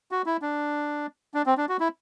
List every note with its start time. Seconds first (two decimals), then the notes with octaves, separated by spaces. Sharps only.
0.11 F#4
0.26 E4
0.42 D4
1.34 D4
1.46 C4
1.57 D4
1.69 F#4
1.80 E4